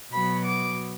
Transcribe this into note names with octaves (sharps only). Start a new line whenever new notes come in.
B2 F#3 B3 B5
D6